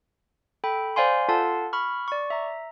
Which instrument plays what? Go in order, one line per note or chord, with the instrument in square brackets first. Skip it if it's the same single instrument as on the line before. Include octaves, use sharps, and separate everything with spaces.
[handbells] A4 G5 B5
C5 D5 F5 G#5 C6
F4 A4 F5 F#5 A5 C6
B5 C#6 F6
D5 C#6
E5 A#5